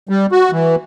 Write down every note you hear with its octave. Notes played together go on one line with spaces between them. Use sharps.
G3
F#4
E3